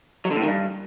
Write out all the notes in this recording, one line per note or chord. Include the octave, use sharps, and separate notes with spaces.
F#3
D3
A2
D#3
G2